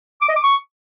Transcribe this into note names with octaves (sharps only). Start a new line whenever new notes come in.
D6
D#5
D6
C#6